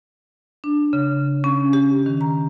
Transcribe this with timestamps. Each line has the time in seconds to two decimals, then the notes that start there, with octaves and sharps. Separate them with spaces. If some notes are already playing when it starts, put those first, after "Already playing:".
0.64 D4
0.93 C#3
1.44 C#4
1.73 G4
2.06 D#3
2.21 A#5